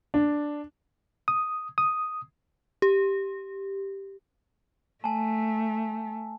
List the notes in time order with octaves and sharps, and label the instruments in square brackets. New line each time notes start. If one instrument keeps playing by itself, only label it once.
[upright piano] D4
[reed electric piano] D#6
D#6
[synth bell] G4
[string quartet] A3 [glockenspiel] G#5 A5